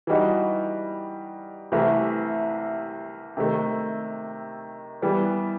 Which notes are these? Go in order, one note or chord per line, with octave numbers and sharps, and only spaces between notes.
E3 G3 D#4 F#4
C2 C3 E3 A3
C3 D#3 A3
E3 G3 B3